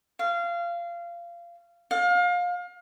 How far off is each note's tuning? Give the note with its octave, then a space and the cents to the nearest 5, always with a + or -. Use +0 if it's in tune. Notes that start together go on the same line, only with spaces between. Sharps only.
F5 -20
F5 +30